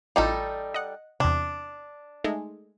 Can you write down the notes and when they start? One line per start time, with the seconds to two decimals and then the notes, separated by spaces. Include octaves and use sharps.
0.16 A1 G3 D#4 F4 A4 F5
0.74 D#5 F#5
1.20 E2 C3 D4
2.24 G#3 A3 D#4